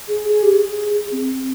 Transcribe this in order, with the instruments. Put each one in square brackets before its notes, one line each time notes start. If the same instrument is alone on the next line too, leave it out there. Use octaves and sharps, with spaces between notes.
[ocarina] G#4
G#4
G4
G#4
C4